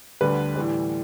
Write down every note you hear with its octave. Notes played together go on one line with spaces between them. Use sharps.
D2 D3 G3 B4
A2 E3 G3